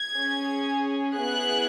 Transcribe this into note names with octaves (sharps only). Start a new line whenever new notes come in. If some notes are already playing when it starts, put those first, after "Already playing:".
Already playing: G#6
C#4 G#4
B3 E4 G#4 F#6